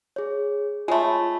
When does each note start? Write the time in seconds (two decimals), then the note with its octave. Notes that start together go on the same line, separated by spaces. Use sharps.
0.16 G#4 C#5
0.88 G#3 A3 F4 C#5 B5